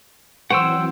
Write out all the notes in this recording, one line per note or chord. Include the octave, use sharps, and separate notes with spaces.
E3 F#3 C4 C5 C#5 F#5 G5 E6